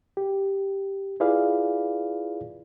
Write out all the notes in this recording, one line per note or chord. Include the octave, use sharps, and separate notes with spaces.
G4
E4 F4 G#4 B4 D5 F5